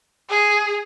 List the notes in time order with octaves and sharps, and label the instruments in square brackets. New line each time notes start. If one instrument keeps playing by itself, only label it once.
[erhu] G#4